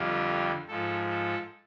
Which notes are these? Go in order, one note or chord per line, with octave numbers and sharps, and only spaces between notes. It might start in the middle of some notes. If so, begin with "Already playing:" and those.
Already playing: F2 D3 G3 F4
G#2 F3 A4
A4